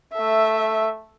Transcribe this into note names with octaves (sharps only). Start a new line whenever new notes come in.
A3 E5